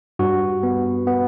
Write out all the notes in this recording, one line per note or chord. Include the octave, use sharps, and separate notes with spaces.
G2 F#4
B3
B3